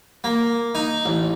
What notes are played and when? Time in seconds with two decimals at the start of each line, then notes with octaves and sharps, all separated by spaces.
0.24 A#3
0.75 D#4
1.05 A1